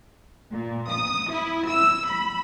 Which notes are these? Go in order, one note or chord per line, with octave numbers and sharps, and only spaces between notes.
A#2
D#6
E4
E6
B5